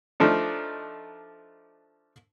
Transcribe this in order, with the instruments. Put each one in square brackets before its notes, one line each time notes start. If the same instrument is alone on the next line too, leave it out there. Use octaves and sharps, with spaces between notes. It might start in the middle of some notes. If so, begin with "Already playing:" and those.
[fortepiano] F3 A3 D4 D#4